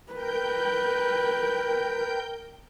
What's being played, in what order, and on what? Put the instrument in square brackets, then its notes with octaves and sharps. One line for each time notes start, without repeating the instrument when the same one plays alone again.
[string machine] A#4 G5 G6 [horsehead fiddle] B4